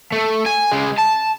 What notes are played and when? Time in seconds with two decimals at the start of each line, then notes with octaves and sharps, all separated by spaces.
0.12 A3
0.46 G#5
0.72 C#3 G#3
0.98 A5